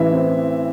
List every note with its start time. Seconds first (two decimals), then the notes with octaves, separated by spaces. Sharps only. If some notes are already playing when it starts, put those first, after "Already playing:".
Already playing: A1 E3 E5
0.12 C4